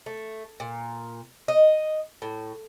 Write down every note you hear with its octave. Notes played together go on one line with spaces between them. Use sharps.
A3
A#2
D#5
A2